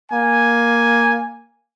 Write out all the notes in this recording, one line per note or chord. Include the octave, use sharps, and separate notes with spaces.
A#3 G#5